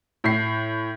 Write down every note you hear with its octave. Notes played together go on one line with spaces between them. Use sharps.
A2 C7